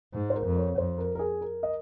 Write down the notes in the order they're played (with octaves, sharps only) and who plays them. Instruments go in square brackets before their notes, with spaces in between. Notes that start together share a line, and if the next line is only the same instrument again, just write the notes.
[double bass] G#2
[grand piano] C5
A#4
[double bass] F2
[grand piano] C#5
[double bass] F2 [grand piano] C5
[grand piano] A#4
A#4
G#4
A#4
D#5